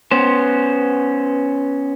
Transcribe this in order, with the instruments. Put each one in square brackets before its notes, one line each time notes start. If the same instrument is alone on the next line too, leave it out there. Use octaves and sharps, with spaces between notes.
[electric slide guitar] B3 C#4 C5